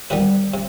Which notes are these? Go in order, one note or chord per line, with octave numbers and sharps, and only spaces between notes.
C3 D#3 G3 B3 B4
C3